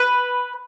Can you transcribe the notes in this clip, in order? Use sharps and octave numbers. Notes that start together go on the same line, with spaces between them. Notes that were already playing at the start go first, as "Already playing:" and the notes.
Already playing: B4